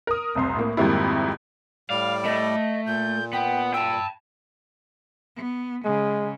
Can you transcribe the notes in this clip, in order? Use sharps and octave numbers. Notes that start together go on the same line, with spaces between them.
A#4 D#6
F1 C2 C6
A2 A#3
F2 G#2 D#3 G3 A#3 E4
A2 G3 D5 F5
A3 D#5
A#2 G6
B3 G5
G5 A5 E6
B3
C#3 G#3